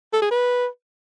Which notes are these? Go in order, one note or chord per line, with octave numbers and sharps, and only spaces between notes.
A4
G#4
B4